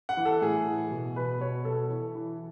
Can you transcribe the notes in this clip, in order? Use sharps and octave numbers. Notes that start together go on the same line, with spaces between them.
F#5
E3
A4
A2 G#4
E3
B2
B2 B4
B2 C#5
B2 A4
E3
E3